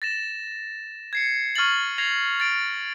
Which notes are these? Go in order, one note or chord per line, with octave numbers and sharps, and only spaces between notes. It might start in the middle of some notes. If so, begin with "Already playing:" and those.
A6 A#6 E7
G#6 C7 C#7
C#6 F6 G#6 A6 F#7
G#6 A#6 C7 F7
A6 D7